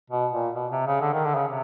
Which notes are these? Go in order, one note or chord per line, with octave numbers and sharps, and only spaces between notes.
B2
A#2
B2
C3
C#3
D3
D#3
D3
C#3
C3